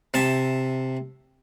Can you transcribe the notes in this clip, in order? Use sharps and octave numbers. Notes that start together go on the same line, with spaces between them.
C3 E5 A5